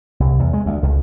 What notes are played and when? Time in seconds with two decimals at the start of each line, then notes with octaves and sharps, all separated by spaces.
0.20 C2
0.39 E2
0.53 G#3
0.66 D2
0.83 C#2